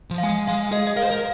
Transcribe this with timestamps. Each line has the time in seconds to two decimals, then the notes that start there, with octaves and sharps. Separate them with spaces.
0.11 F3
0.18 F5
0.23 G#3 G#5
0.47 G#3 F5
0.72 G#4 D#5
0.87 D#5
0.97 A#4 F5
1.03 C5
1.11 A#4